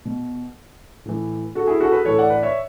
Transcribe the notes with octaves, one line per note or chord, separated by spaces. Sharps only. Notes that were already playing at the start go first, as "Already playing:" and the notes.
B2
A2 E3
F#4 A4
E4 G#4
F#4 A4
G#4 B4
A2 E3 A4 C#5
D5 F#5
B4 D5
C#5 E5